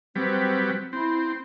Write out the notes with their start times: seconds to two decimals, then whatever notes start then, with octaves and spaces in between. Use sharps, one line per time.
0.16 F#3 G3 C4 B4
0.93 C4 E4